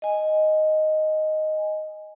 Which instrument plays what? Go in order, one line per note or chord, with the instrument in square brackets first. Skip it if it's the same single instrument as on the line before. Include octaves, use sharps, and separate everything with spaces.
[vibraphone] D#5 G#5